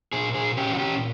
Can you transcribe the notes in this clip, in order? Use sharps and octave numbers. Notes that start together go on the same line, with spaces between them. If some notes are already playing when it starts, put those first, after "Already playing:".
A#2 G#4
G#4
C#4 G4
F#4
G4